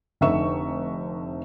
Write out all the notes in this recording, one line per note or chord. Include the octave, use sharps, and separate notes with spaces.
F1 D3 D#4 E5 C#6 E7